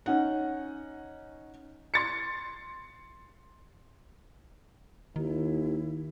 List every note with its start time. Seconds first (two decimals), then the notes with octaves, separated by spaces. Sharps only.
0.06 C#4 D#4 F#5
1.94 C6 A6 C#7
5.16 D#2 D#3 E4